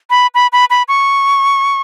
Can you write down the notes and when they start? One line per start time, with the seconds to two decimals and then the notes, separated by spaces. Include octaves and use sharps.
0.10 B5
0.35 B5
0.53 B5
0.70 B5
0.88 C#6